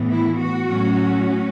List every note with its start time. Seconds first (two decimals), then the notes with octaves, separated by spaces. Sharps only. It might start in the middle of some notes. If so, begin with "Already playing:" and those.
Already playing: A2 E3 B3
0.11 E4
0.39 F#4
0.69 A2 F#3 C#4